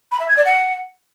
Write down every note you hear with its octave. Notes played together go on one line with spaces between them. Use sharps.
B5
E5
G#6
D5
F#5